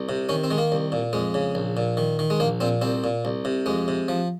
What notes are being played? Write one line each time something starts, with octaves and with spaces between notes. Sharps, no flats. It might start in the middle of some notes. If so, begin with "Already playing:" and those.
Already playing: C2
C3
D#3 C#4
C4
D#3 G#3
A#3
C2
A#2
F2 G#3
C#3
A#1
A#2
D#3
D#3
G#3
A#1 A#3
A#2 C4
C2 C4
A#2
C2
C3
F2 G#3
C3
F3